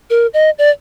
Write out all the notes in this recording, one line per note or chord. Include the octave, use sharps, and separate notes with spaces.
A#4
D#5
D5